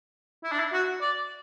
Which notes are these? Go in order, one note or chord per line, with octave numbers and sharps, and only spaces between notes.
E4
D4
E4
F#4
D5